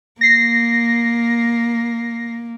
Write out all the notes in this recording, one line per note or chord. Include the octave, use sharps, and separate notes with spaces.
A#3 A#6 C7